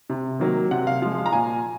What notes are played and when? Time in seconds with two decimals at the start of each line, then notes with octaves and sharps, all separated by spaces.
0.10 C3
0.39 D#3 F#3 A#3
0.71 C3 F#5
0.87 F5
1.02 F3 G#3 F5
1.18 F5
1.26 A#5
1.33 A#2 G#5